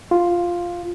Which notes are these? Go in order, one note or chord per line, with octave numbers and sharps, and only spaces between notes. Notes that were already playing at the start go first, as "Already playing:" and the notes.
F4